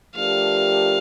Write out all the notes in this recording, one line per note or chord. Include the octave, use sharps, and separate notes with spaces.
F3 A3 D4 G4 A#4 F5